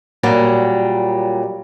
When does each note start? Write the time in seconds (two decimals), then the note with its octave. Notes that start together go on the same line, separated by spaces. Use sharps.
0.23 A#2 F#3 G3